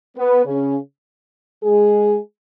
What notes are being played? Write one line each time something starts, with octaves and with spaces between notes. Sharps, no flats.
B3 B4
C#3 C#4
G#3 G#4